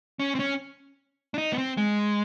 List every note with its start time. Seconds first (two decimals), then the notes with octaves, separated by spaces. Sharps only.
0.19 C#4
0.35 C4
0.39 C#4
1.34 D4
1.38 D#4
1.53 B3
1.58 C4
1.77 G#3